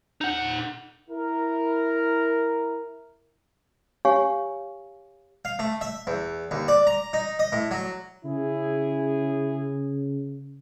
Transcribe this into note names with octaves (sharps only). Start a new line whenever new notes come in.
D#4 F#5
E4 A#4
G4 C#5 F5 G#5 C#6
F5
A3
E5
E2
D#2
D5
A#5
D#4
D#5
A2
F#3
C#3 C#4 E4 G#4